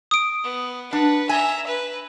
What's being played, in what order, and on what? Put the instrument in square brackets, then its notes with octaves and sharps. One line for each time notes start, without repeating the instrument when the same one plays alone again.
[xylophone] D#6 D7
[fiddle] B3
[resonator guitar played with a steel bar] D4 [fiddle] B4 F#5
[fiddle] E5 A#5 [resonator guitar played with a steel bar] G#5
[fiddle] B4